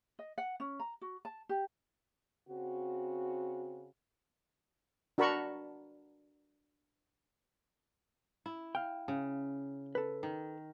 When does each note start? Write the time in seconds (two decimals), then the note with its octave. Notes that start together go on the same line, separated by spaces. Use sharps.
0.19 D#5
0.38 F#5
0.60 C#4
0.80 A#5
1.01 F#4
1.25 A5
1.49 G4
2.49 C#3 C4 F#4
5.18 D4 F#4 A#4 A5 B5 C#6
8.46 E4
8.75 F5 G5
9.08 C#3
9.95 A4 B4
10.23 D#3